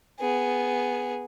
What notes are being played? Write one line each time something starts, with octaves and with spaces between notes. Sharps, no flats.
B3 G#4